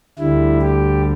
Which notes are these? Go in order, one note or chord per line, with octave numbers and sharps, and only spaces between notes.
D2 D3 G3 E4
G4